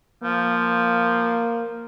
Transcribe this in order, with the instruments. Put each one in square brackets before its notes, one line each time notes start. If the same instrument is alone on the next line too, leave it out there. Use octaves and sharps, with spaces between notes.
[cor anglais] F3 [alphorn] A#3